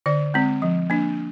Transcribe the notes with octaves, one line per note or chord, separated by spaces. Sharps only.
D3 D5
G#3 C4
F3
A#3 D4